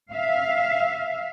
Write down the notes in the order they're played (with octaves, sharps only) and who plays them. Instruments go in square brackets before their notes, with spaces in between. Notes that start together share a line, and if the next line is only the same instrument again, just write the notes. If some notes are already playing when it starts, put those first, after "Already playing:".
[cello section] E5 F5